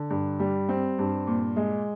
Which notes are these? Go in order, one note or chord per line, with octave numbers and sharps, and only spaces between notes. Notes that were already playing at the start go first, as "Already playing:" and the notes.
Already playing: D3
G2
G3
C4
G2
A#2
G#3